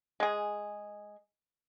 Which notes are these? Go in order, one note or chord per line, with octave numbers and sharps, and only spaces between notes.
G#3 G#4